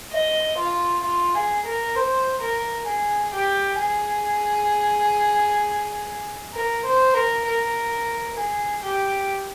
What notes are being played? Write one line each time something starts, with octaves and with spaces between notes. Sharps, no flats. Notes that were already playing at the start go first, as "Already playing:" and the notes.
D#5
F4
F4
G#4
A#4
C5
A#4
G#4
G4
G#4
A#4
C5
A#4
A#4
G#4
G4